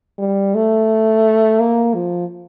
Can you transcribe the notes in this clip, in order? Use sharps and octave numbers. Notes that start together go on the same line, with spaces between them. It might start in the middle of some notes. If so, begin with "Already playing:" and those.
G3
A3
A#3
F3